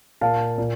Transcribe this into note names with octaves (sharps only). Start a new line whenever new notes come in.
A#2 F5 A5
A#2